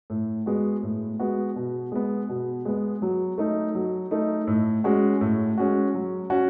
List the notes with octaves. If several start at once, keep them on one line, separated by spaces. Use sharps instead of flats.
A2
G#3 B3 F#4
A2
G#3 B3 F#4
B2
G#3 B3
B2
G#3 B3
F#3
A3 D#4
F#3
A3 D#4
A2
G#3 C#4 F#4
A2
G#3 C#4 F#4
F#3
C#4 F#4